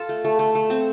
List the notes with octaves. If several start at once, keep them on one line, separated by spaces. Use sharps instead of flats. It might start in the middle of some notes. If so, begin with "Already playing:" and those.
Already playing: F4 A4
A3
A3
A3
A3
C4